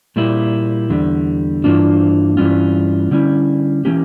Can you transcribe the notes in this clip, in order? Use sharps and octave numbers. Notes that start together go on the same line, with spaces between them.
A#2 G3 A#3 E4
E2 D3 G3
G2 E3 A#3 D4 F4
G2 E3 G3 C#4 F4
D3 G3 C#4 E4
E3 A#3 C#4 G4